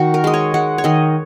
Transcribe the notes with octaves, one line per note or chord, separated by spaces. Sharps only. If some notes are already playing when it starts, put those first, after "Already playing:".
Already playing: D#3 F#4
A#4
G#3 D#5
C#5
G#3 F#5
C#5
D#3 D#5